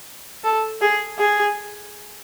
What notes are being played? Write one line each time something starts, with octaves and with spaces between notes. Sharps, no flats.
A4
G#4
G#4